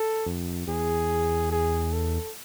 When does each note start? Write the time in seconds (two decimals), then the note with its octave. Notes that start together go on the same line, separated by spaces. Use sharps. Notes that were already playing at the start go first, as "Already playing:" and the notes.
Already playing: A4
0.26 F2
0.68 E2 G#4
1.51 G#4
1.93 A4